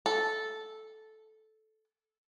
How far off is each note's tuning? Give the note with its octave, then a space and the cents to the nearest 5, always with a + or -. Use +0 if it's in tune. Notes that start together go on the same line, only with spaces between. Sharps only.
A4 -10